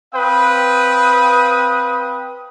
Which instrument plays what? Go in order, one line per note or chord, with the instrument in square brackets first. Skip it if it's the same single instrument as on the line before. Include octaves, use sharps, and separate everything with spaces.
[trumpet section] C4 B4 F5 G5 D#6